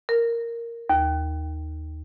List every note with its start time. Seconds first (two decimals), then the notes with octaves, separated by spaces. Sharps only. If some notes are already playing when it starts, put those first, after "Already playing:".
0.09 A#4
0.90 D#2